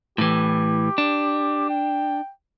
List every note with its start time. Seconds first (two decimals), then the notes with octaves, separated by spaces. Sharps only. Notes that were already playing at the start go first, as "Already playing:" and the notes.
0.18 A2 E3 G4
0.98 D4
1.70 G5